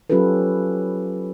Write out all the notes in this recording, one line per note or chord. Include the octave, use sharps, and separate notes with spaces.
F#3 C#4 F4 G4 A4 B4